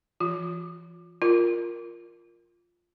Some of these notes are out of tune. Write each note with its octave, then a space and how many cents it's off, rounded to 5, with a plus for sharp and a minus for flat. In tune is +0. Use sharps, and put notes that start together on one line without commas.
E3 +40 F4 +35
F4 +0 A#4 +0